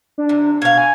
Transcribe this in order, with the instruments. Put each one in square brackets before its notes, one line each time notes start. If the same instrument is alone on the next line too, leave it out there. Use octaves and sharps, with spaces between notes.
[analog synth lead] D4
[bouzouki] C3
[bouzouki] B2 F5 [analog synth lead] G#6
[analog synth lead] G#5